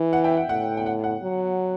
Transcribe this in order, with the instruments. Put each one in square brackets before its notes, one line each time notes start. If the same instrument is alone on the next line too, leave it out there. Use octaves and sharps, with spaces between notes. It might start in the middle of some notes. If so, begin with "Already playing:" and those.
Already playing: [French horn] E3
[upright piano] F#5
E5 G5
F#5
[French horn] A2 [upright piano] F#5
[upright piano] G5
F#5
F#5
[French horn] F#3